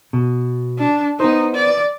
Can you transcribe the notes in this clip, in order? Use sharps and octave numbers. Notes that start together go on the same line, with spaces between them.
B2
D4
B3 D#4 C5
D5